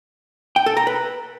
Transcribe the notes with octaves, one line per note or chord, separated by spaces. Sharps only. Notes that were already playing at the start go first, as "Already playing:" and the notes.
G5
A4
A#5
B4